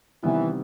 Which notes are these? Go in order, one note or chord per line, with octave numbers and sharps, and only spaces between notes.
C3 D#3 E3 G3 B3 E4